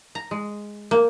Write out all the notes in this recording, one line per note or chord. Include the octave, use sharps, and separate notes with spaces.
A#5
G#3
A#3